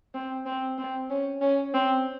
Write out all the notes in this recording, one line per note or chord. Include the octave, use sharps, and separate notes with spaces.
C4
C4
C4
C#4
C#4
C4